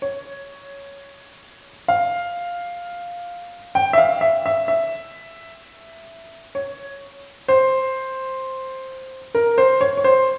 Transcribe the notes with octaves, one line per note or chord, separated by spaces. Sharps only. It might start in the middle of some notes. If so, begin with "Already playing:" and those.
C#5
F5
G5
E5
F5
E5
E5
E5
C#5
C5
A#4
C5
C#5
C#5
C5